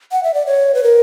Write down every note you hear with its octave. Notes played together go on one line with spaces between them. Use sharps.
F#5
E5
D5
C#5
B4
A#4